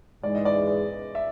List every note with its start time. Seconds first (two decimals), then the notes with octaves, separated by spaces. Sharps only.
0.23 G#2 E3 G#3 D5
0.35 D#5
0.45 D5
1.15 E5